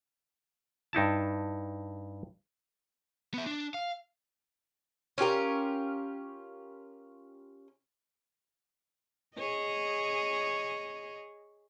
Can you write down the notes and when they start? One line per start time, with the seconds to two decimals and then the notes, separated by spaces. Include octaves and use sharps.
0.93 G2 D#4 E4 A5
3.34 B3 E5
3.46 D4
3.74 F5
5.18 C#4 F4 G4 A#4
9.36 G#4 C#5 D#5